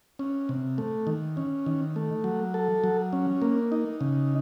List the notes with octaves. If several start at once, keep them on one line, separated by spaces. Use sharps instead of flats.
C#4
C3
A3
D#3
C#4
D#3
A3
F#3
A4
F#3
C#4
A#3
D#4
C#3